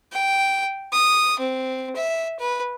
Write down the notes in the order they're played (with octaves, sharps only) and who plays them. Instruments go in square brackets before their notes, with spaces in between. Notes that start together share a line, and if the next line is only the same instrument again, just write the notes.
[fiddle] G5
D#6
C4
E5
B4